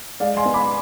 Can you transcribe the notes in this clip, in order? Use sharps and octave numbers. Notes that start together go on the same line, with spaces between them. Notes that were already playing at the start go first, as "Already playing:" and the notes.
G#3 D5 F5
G#5 C6
B3
B5 D6